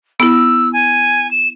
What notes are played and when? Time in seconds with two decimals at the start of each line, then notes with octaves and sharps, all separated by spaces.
0.20 B3 E4 E6
0.73 G#5
1.31 E7